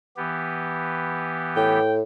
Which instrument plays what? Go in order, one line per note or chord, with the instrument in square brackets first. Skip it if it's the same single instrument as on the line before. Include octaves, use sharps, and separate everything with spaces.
[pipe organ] E3 B3 G4
[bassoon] A2 [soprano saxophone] G5